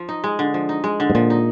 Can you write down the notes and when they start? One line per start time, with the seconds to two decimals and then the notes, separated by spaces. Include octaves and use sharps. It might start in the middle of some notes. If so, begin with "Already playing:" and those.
Already playing: F3
0.09 D#4
0.24 G#3
0.39 D3
0.54 F3
0.69 D#4
0.84 G#3
1.00 D3
1.10 G#2
1.15 A#2 F3
1.30 D#4